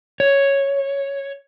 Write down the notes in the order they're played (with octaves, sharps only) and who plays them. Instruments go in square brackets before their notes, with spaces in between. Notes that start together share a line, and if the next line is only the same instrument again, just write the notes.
[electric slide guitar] C#5